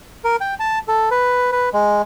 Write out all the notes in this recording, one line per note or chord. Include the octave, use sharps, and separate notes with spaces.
A#4
G5
A5
A4
B4
B4
G#3